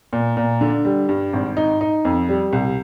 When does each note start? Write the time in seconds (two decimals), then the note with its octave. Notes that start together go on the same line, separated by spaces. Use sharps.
0.13 A#2
0.37 A#2
0.61 D3
0.85 G3
1.09 G2
1.33 G#1
1.57 D#4
1.81 D#4
2.05 F2
2.29 G3
2.53 C2